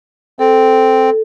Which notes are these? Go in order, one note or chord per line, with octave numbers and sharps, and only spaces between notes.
C4 A4